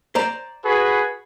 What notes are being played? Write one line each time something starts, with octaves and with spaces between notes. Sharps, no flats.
C5 D5 A#5
F#4 G#4 B4